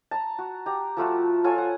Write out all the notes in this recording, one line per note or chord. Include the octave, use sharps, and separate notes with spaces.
A5 A#5
F#4
G4 A#5
F3 A3 F4 F#4
F4 A4 C#5 G#5
F#5